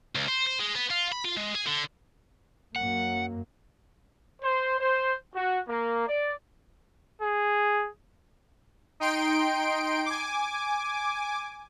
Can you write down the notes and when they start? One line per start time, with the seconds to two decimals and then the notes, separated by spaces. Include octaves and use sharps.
0.15 C#2
0.28 C5
0.47 C5
0.60 G#3
0.75 B3
0.90 F4
1.12 B5
1.25 F4
1.37 G#3
1.55 G#4
1.67 D3
2.76 F#2 F#3 A#3 F#5
4.42 C5
4.79 C5
5.34 F#4
5.68 A#3
6.07 D5
7.22 G#4
9.00 D#4 G5 C6 D7
10.06 G#5 D6